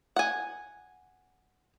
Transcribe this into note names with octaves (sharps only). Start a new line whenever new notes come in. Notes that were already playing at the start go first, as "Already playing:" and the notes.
F#5 G#5